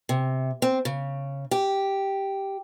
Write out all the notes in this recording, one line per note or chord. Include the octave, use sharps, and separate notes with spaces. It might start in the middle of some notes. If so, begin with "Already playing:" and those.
C3
C4
C#3
G4